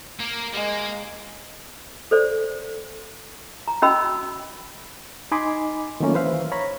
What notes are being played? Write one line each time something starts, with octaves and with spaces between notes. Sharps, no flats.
A#3 A#4
G#3 A#3
A4 C5 D5
A#5
C#4 F#4 D#5 G5 B5 E6
D#4 D#5 G#5 B5 C6 D6
D#3 F#3 A3 A#3 C#4 F4
E3 B4 C5 E5 F5
C#5 A#5 B5